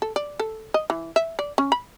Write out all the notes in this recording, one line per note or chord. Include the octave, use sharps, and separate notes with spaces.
A4
D5
A4
D#5
E3
E5
D5
C#4
B5